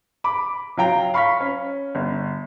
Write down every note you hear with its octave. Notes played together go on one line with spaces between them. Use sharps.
B5 D6
F#3 F4 G5 A#5
F5 B5 C#6 F6 B6
C#4
G1